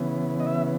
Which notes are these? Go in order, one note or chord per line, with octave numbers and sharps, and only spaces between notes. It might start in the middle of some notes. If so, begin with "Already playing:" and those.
Already playing: C#3 E3 B3
D#5
E5